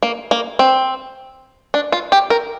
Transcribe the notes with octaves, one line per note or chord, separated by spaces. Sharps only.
A#3
A#3
C4
D4
F4
G4
A#4